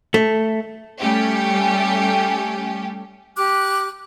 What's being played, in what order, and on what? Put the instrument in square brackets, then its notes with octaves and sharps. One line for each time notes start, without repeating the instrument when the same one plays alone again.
[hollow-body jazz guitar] A3
[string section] G3 A3 C#4 G4
[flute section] G4 D6 F#6